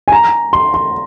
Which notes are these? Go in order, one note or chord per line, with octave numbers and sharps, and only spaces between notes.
G#5
A#5
C6
C6